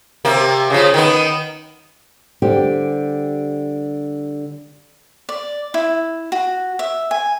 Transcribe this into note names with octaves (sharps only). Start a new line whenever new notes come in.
C3 A#3
C#3 F3
D#3 B3
D3 G3 G4 C5
D5
E4
F#4
E5
G#5